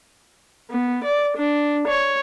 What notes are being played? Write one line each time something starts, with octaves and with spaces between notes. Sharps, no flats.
B3
D5
D4
C#5